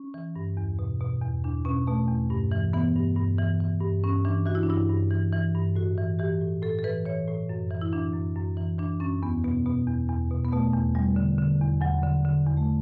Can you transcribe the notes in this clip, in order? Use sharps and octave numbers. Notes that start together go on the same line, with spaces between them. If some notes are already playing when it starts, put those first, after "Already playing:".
Already playing: C#4
E3
G2
E2
B2
B2
E2
E2 D4
B2 C#4
B2 A3
E2
G2
E3
E3 B3
G2
G2
E3
E3
G2
G2 C#4
E3 D4
E3 F#4
E4
D4
G2 E4
G2
E3
E3
G2
A2 F#4
E3
E3 G4
A2
A2 A4
A4
E3 B4
E3 C#5
A2
F#2
E3
E4
E3 D4
F#2
F#2
E3
E3 D4
F#2 C#4
E2 B3
B2 B3
B2 B3
E2
E2
B2
B3
B2 A3
E2
E2 G3
D3
D3
E2
E2 F#3
D3
D3
E2
A3